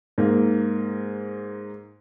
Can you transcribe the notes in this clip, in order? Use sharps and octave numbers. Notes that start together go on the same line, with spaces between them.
G#2 A#3